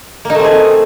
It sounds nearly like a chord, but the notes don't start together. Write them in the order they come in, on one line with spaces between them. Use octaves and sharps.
A#3 D#4 A3 C4 G#4